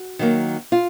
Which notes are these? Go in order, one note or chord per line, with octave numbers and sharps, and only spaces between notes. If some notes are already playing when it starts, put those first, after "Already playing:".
Already playing: F#4
D#3 F#3 A#3
F4